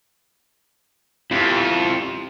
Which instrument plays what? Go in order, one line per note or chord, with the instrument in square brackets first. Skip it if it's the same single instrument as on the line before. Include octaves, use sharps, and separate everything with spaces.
[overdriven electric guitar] F2 [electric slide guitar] E4 G4